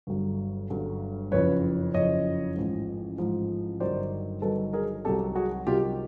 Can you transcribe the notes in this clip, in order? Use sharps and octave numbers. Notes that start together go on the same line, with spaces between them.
G1 G2 D3 F#3
G1 G2 D3 F#3
F#1 F2 C#3 F3 B4 C#5
F#1 F2 C#3 F3 C#5 D#5
A1 G#2 F3
A1 G#2 F3
G1 G2 D#3 F#3 C5 D5
G1 G2 D#3 F#3 A4 B4
G#4 A#4
C2 C3 D#3 F#3 G4 A4
F#4 G#4
C2 C3 D#3 F#3 F4 G4